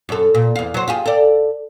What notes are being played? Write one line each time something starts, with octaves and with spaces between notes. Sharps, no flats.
F#2 A4
A#2
E2 F5
F#3 C5
F4 G4 G#4
A4 D5